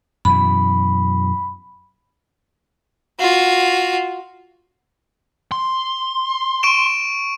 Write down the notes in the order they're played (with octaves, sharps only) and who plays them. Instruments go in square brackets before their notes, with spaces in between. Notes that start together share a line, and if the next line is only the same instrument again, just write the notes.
[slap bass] F#2 B2 E3 [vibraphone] B5
[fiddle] F4 F#4
[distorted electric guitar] C6
[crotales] C#6 D7 E7